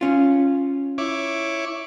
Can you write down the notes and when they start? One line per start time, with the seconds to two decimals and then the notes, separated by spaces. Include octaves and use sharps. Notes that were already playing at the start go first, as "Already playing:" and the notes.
0.01 C#4 F4
0.98 E4 C#5 D6